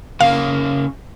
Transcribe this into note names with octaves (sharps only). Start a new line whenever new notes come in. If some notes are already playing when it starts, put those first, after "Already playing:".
C#3 A#3 F5